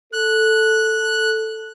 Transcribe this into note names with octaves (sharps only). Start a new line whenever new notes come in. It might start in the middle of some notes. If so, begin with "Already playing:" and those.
A4 F#6